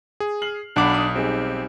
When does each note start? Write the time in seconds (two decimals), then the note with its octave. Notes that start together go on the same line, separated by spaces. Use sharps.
0.20 G#4
0.42 F6 C7 F#7
0.76 B1 D4 F#5 B5 D6
0.94 D#6
1.15 G3 C4 D#4 G#4